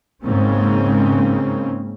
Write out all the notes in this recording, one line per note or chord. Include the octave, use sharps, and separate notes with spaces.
G#2 C#3 A#3 C4 C#4